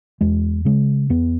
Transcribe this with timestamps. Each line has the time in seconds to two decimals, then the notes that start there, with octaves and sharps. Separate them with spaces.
0.21 E2 G#3
0.65 C#3 G#3
1.10 E2 B3